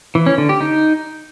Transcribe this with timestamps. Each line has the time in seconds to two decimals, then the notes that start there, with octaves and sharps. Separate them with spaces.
0.15 E3
0.26 C#4
0.38 D3
0.49 G4
0.61 D#4